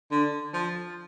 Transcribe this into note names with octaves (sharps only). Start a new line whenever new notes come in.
D3
F3